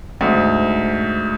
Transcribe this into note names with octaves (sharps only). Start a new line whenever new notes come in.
D2 G#2